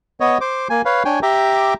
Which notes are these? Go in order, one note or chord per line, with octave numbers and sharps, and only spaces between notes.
B3 C#5 D#5
C5 D6
A#3 G#5
B4 C#5 F5
D4 C#5 G5 G#5
G4 E5 G5 A#5 D6